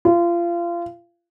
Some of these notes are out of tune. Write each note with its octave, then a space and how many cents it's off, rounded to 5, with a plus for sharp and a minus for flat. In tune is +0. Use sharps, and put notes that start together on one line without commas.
F4 -25